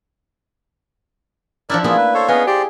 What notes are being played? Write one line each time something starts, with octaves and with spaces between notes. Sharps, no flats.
F3 D4 E4 A#4 D5
A#3 B3 E4 F4 G#4
B4
A4 C5 C#5
B3 C#4 G#4 D#5 F5
G4 C5 D5